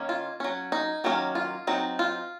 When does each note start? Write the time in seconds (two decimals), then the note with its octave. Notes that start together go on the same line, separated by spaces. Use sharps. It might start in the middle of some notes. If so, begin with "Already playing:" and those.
Already playing: D#3 A#3 C#4
0.09 F4
0.40 F#3 C#4
0.72 D#4
1.04 D#3 F#3 A#3 C#4
1.35 F4
1.67 F#3 C4 D#4
1.99 F4